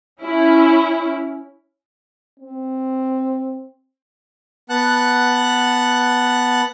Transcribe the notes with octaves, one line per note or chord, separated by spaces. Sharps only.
C#4 E4
C4
B3 F#5 A5 F#6